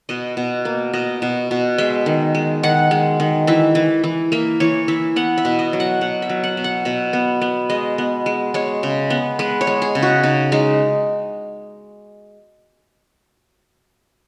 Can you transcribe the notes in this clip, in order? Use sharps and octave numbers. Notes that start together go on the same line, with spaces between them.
B2 D#5
B2
A#3
B2 D#5
B2
B2
G#3 E5
D#3
G#3
D#3 F#5
G#3
D#3
E3 E5
E3
E3
A#3 E5
E3 C#5
E3 E5
B3 F#5
E5
B2
D#5
F#3
F#5
B2 F#5
E5
F#3
F#5
B2
F#5
B2 E5
B3
B3
G#3 D#5
B3
G#3
G#3 C#5
C#3
B3
G#3 B4
C#5
G#3
G#4
C#3
F#4
C#3 D#4
G#3 D#4